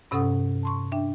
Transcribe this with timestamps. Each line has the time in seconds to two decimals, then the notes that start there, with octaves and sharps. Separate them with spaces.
0.11 G2 C3 C#4 A4 F#5 D#6
0.63 A5 C6 C#6
0.92 D4 E5 G5